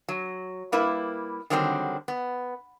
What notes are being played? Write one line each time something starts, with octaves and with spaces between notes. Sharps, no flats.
F#3
G3 A#3 E4 B4
D3 D#3 F#3 G3 C4 D4
B3